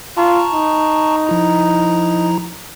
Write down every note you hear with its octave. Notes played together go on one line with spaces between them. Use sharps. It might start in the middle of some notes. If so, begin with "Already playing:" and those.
F4 A5 A#5 C#6
D#4
F3 E4 A#5